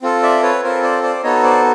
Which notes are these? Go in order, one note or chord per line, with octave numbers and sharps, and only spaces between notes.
C4 F4 A4
D5 E5
B4 C#5
C4 F4 A4 A#4 C5
C5 D5
C5 D5
B3 D#4 F#4 A4 C#5 D#5
C5 D5